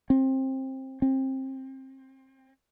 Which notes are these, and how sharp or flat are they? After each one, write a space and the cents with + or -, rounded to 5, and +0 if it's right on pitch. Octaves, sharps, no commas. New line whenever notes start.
C4 +20
C4 +25